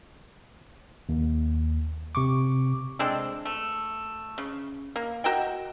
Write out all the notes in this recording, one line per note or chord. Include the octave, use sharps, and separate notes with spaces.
D#2
C3 C#6 D6
G#3 C4 D4 A4
A3
C#3
A#3
F#4 A#4 D#5 G5